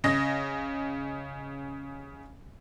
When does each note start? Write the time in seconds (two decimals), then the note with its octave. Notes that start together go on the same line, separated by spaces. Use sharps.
0.04 C#3 D#5 A#6